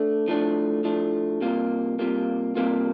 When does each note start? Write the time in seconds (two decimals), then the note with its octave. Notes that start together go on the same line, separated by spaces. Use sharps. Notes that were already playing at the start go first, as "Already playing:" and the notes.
Already playing: A3 D4
0.28 A2 F3 A3 D4
0.84 A2 F3 A3 D4
1.41 C3 G3 A#3 F4
1.99 C3 G3 A#3 F4
2.55 C3 G3 A#3 F4